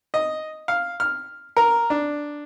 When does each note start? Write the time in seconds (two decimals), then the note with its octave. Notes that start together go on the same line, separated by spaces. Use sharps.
0.14 D#5
0.68 F5
1.00 F6
1.57 A#4
1.90 D4